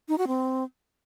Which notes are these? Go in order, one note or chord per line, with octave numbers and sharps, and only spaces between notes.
D#4
F#4
C4